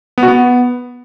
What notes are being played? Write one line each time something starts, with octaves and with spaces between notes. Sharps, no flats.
B3
F#4
B3